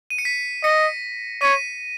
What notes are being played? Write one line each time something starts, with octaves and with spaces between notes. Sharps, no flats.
D#7
C#7
B6
D#5 A#6 C#7
C#5 B6 D#7